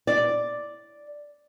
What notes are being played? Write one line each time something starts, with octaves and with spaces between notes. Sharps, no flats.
D5